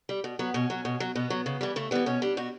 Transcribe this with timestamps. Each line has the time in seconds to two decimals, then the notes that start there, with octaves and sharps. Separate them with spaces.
0.09 G3
0.24 B2
0.39 F#3 B3
0.54 B2 C#4
0.70 F#3
0.85 B2
1.00 F#3
1.15 B2 B3
1.30 F#3
1.46 C#3
1.61 E3 G3
1.76 C#3 A3
1.91 E3 G3 B3
2.06 B2 C#4
2.22 G3 D4
2.37 B2 F#4